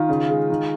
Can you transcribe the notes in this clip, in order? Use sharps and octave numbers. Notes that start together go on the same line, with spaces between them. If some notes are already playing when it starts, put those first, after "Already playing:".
Already playing: D#3 F4
C#3
G#3
D#3